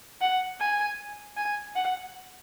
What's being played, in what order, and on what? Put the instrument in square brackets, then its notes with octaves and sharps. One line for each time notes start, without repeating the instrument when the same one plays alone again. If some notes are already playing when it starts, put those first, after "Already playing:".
[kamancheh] F#5
G#5
G#5
F#5